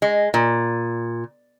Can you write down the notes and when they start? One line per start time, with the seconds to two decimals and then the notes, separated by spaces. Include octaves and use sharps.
0.02 G#3
0.34 A#2